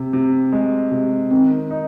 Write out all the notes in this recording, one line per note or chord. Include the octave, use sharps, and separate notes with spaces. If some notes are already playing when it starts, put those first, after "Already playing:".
Already playing: C3
C3
G#3
C3
D#3 C4
D#4